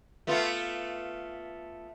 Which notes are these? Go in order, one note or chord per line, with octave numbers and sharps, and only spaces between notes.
A3 B3 F4